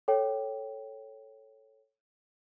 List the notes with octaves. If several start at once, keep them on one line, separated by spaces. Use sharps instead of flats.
A4 C#5 G5